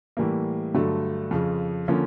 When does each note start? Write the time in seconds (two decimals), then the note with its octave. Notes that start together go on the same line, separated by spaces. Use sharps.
0.17 A2 E3 G3 A#3
0.74 G2 D3 F#3 A3
1.31 F2 C#3 F3
1.88 D3 F3 A#3 C#4